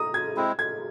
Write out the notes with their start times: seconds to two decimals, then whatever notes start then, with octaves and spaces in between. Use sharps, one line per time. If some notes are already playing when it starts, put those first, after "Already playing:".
Already playing: A#5 D#6
0.14 G#6
0.37 G#3 C4 E4
0.59 G#6